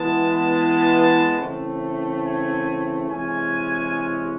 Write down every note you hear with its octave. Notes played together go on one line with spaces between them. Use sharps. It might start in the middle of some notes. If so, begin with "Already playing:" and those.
Already playing: E3 G#3 B3 A5
C#3 E3 A3 C4
G#5
C3 E3 G#3 C#4 G#5